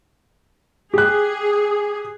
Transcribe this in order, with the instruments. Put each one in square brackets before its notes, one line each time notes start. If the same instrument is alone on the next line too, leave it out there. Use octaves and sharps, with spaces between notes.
[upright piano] G4 F#6 [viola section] G#4